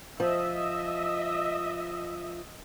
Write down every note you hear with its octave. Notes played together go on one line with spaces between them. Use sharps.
F3 D#5 E5